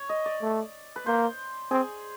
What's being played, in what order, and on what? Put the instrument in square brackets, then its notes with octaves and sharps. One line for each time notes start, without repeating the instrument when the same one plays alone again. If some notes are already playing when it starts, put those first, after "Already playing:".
Already playing: [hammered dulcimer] C#5
D#5
D5
[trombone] A3
[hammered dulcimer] B4
[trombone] A#3 [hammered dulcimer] C5
[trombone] C4 [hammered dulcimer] G#4